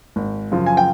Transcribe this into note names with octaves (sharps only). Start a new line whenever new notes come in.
G#1
F#2 C#3 F3
G#5
G5